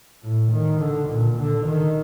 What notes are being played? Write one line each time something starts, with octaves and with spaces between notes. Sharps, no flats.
A2
D#3
D3
A#2
D3
D#3